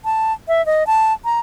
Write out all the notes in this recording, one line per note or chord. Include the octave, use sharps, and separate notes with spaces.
A5
E5
D#5
A5
A#5